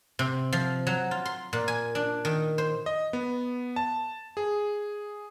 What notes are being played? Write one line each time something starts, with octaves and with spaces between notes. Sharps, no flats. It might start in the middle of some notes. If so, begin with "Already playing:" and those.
C3
F3
F#3
F4
C6
A#2
G#5
D4
D#3
C5
D#5
B3
A5
G#4